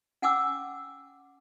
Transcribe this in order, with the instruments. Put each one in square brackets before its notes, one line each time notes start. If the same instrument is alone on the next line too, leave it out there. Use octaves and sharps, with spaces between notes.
[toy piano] C#4 F#5 G#5 D6 E6